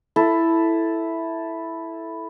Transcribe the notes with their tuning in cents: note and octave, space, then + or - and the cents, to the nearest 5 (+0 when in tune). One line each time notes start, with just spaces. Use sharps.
E4 +0 A4 +0